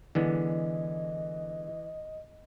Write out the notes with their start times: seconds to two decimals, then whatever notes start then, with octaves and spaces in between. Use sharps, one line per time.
0.15 D3 E3 G#3 B3 D#5